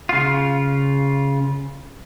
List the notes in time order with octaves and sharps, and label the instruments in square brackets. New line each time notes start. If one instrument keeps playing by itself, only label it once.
[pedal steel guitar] C#3 F4